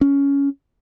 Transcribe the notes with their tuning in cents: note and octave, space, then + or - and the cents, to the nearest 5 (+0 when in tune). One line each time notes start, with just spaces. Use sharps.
C#4 +10